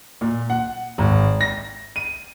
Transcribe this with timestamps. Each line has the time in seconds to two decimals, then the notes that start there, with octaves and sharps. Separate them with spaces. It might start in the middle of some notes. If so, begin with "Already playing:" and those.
0.21 A#2
0.50 F#5
0.98 G#1
1.41 A#6
1.96 D#7